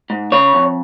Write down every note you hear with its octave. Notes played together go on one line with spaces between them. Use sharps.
G#2
C#3 C#5
F2